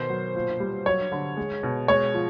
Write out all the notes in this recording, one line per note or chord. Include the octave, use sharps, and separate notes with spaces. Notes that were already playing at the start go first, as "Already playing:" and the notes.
Already playing: B2 D#3 C5
F#3
A#2
G3
F#3 C#5
D3
G#3
B2
G#3 C#5
F3